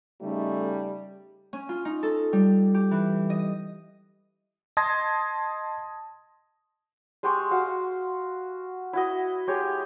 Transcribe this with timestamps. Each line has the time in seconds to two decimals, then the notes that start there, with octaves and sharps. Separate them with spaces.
0.22 C#3 G3 A3 D#4
1.53 C#4
1.69 F4
1.85 D#4
2.03 A4
2.33 G3
2.74 G4
2.91 E3
3.30 D#5
4.77 D#5 A5 C6 D#6 G#6 A#6
7.23 G#3 G4 C6 C#6
7.51 F#4 F5
8.93 E4 F#4 D#5
9.48 G#3 G4 C#5